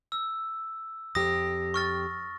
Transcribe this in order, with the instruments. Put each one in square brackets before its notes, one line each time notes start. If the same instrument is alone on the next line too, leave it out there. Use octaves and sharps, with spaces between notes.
[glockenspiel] E6
[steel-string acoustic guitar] F2 G4 [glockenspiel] D#6 A#6
[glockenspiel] C#6 F6 A6